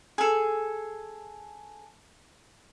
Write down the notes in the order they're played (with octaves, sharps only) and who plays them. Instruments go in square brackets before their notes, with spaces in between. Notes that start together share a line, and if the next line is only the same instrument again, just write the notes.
[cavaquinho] G#4 A4